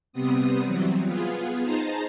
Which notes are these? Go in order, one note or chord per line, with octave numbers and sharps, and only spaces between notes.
C3 G3 B3 C4 D#6
E3 F#3 G3 C4
B3 F4 G#4
D#4 G#4 C5 A5 A#5